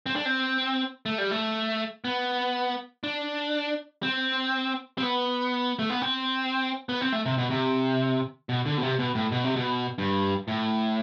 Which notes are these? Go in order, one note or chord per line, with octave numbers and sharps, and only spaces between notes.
C4
D4
C4
A3
G3
A3
B3
D4
C4
C4
B3
A3
B3
C4
B3
C4
A3
C3
B2
C3
B2
D3
B2
C3
B2
A2
B2
C3
B2
G2
A2